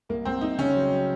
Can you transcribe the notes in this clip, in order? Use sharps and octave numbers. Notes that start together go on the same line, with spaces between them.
C2 A#3
C2 C4
C2 D#4
C#3 C#4
F#3
F#3